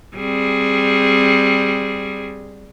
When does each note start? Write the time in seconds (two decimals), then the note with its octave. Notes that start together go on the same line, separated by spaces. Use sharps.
0.17 G3 C4 G#4